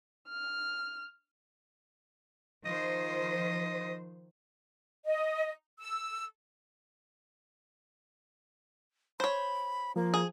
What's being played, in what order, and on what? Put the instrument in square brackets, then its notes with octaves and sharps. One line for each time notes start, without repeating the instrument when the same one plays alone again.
[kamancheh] F6
[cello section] D#3 F3 C5 [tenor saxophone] D#5
[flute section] D#5
E6
[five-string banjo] C5 C#5 [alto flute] B5
[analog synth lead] F3 [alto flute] A#3
[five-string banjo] G#4